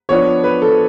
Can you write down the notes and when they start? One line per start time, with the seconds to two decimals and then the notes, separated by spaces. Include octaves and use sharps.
0.09 F3 B3 D4 C#5
0.44 B4
0.62 A4